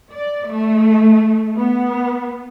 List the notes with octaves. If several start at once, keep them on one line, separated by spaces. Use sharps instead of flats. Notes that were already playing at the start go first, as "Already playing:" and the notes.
D5
A3
B3